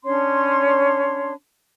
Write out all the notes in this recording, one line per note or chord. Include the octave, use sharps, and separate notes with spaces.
C#4 D4 C#5 C6